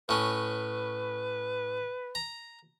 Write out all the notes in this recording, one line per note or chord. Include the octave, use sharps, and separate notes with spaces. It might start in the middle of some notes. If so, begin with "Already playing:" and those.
A2 C#4 B4
A#5